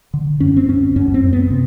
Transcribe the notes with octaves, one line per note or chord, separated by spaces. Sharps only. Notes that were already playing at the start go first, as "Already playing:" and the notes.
D3
F#2 C#4
C4
F#2 C#4
F#2 C#4
C4
F#2
B3
C3